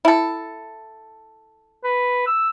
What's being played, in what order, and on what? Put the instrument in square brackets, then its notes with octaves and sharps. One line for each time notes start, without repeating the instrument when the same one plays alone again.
[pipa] E4 A4
[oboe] B4
E6